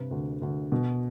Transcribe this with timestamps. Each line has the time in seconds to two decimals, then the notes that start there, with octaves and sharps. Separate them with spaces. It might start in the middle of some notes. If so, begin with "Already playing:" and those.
Already playing: G2 C3 B4
0.11 D2
0.42 D2
0.72 B2